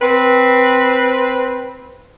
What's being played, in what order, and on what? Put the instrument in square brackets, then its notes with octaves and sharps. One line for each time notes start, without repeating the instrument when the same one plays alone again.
[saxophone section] C4 B4